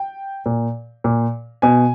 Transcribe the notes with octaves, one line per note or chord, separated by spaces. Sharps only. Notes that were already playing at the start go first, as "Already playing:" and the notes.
Already playing: G5
A#2
A#2
B2 G#5